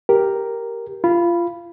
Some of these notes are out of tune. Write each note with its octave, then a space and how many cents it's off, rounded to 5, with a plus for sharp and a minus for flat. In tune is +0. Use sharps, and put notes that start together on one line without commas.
G4 +0 A#4 +0
F4 -20 B5 +0